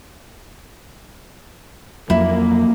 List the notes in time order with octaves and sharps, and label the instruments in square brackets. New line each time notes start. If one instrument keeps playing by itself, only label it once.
[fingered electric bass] F2 F#3 [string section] A#3 [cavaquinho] E4